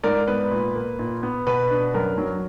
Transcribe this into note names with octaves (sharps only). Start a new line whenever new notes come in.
G#2 A#4 D5
B3 B4
A#2
A#3
A#2
B3
B2 B4
D4
F#2 A#4
F#3